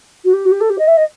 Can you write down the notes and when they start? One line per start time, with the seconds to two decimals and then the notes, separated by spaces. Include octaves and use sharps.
0.24 F#4
0.33 G4
0.45 F#4
0.51 G4
0.60 A4
0.69 G4
0.78 D#5
0.87 E5
0.97 D#5